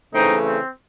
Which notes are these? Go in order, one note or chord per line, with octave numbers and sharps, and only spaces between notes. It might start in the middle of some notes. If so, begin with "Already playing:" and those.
C#3 E3 A3 C4 D#4
C4